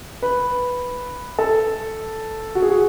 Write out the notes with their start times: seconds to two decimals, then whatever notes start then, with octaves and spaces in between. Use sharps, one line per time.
0.22 B4
1.39 A4
2.55 F#4
2.62 G#4
2.70 F#4